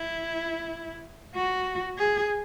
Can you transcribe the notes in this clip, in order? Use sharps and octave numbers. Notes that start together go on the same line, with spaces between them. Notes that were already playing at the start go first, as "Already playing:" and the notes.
Already playing: E4
F#4
G#4